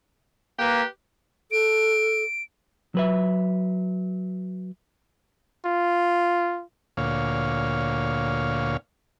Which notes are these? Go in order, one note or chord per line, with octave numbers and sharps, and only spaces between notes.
A#3 G4 B4
A4 D7
F#3 B4 E5
F4
D2 A#2 C#5 F5